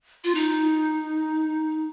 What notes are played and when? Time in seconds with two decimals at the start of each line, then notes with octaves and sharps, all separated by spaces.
0.24 F4
0.35 D#4